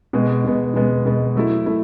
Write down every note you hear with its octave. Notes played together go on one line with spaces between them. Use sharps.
B2 G#3 B3
B2 G#3 B3
B2 G#3 B3
B2 G#3 B3
F#3 A3 E4
A3 E4